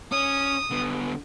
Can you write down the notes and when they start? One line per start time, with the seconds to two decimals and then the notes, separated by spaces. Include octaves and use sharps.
0.12 C#4 D#6
0.70 D3 B3